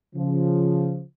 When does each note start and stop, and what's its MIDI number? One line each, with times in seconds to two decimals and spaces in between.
0.16 1.02 49
0.16 1.02 53